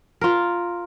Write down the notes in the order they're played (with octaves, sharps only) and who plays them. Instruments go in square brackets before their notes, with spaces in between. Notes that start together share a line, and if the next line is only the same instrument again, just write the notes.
[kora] F4 A#4